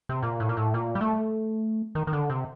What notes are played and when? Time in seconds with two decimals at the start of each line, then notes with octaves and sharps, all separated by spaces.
0.09 C3
0.23 A#2
0.40 A2
0.49 A#2
0.57 A2
0.74 A#2
0.95 G3
1.01 A3
1.95 D#3
2.07 D#3
2.13 D3
2.30 C3